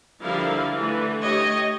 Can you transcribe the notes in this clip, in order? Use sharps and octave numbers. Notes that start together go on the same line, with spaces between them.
D3 F3 G3 E4 A#4 F5
D3 E3 A3
A3 G4 C#5 D#5